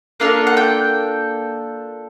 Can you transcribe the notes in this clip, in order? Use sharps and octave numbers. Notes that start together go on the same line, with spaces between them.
A#3 D4 F4 A4 F5
F#5
G5